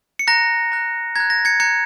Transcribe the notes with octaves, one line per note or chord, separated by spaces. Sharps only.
C#7
A#5 F#6 A#6
A#5 F#6
A#5 F#6 G#6
A#6
G#6 C#7
A#5 F#6 G#6 C#7